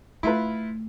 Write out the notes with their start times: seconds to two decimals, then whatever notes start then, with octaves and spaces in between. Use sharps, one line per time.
0.23 A3 E4 F4 B4